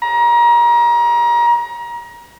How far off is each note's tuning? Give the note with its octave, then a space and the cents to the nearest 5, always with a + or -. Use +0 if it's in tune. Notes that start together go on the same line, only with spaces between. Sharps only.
A#5 +30